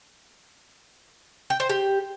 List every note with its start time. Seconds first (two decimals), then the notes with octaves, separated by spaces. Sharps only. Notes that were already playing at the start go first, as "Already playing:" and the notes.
1.50 G5
1.60 C5
1.69 G4